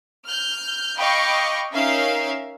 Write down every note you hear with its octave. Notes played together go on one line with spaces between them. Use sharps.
F6 G6
D#5 F5 G5 B5 C#6 D6
C#4 D#4 A#4 E5 F5